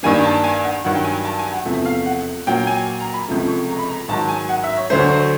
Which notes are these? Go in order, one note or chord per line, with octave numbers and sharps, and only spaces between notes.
G2 D#3 G3 A#3 G#5
A5
G#5
F#5
G2 D#3 F#3 F#5
G5
G#5
A5
G#5
F#5
E2 C3 F3 A3 E5
F5
F#5
A#2 F#3 A#3 G5
G#5
A#5
B5
C#2 C3 F3 A3
C#6
A#5
B5
A#5
G#2 D#3 F#3 A5
G#5
F#5
E5
C#5
D2 D3 F#3 A3 C5
C5